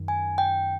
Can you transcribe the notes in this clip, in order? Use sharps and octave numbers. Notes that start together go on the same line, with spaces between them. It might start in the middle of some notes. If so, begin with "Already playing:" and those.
Already playing: F#2 D#3
G#5
G5